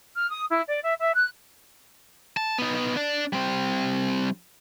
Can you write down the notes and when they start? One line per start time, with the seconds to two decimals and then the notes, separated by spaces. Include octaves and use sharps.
0.16 F6
0.30 D#6
0.49 E4
0.68 D5
0.82 E5
0.99 E5
1.14 F#6
2.37 A5
2.58 B3 D#4
2.96 D4 D5
3.33 G3 C4